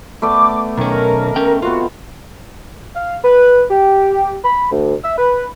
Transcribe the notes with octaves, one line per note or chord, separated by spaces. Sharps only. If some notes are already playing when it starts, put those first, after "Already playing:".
A3 B3 D5 D6
B1 D#3 C#4 A#4
C#4 G5
B3 C4 F4 F#4 C5
F5
B4
G4
B5
D2
E5
B4